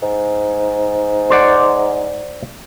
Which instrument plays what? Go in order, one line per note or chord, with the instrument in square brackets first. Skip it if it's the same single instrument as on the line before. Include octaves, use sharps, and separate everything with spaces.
[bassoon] G#2
[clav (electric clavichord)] C5 D5 F#5